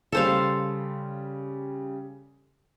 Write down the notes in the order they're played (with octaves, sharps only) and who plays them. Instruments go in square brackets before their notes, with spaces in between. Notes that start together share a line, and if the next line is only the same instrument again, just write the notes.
[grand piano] C#3 G3 [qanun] A4 C5 F5